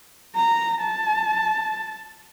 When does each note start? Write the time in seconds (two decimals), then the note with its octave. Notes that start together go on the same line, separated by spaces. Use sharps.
0.36 A#5
0.81 A5